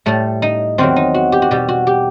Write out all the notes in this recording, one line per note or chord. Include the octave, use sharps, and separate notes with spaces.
A2 G3 A3
D#4
E2 D#3 F#3 C4
D#4
F#4
G4
F#4
B2 G3 G4
F#4
G4